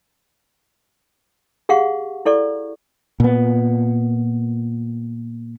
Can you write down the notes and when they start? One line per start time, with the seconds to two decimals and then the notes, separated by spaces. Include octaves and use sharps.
1.69 G4 G#4 F5 F#5 C#6
2.26 E4 A4 D5 C#6
3.20 A#2 B3